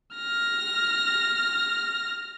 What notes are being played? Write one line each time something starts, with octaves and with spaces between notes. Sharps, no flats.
F6 A#6